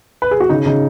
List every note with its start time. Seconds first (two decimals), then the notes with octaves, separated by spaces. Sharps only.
0.22 B4
0.31 G#4
0.40 F#4
0.49 C#3 D#4
0.66 C#3 D#4